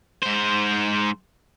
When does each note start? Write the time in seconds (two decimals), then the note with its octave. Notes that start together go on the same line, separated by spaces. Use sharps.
0.23 G#2 C5